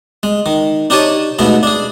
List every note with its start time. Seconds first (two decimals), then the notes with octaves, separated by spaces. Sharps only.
0.23 G#3
0.46 D#3
0.90 D4 D#4 G4 C#5 G#5 A5
1.39 G#2 B2 A3 B3
1.63 D4 G#4